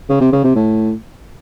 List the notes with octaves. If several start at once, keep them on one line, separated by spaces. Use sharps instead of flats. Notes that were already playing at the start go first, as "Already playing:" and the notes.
C#3
C3
C#3
C3
A2